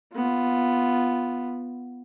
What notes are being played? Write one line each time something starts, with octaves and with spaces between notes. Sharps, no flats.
B3 F4